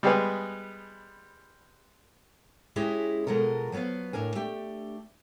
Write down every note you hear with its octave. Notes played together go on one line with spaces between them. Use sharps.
G3 G#3 B3 G4 G#4 B4
G#3 C#4 E4 G4 G#4 D#5
B2 F3 G#3 A4 A#4
F3 F#3 B3 B4 F5
A2 D4 A#4 G#5
A3 D4 G4